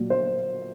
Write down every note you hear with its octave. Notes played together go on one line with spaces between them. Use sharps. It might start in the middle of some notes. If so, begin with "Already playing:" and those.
Already playing: A#2 F#3
C5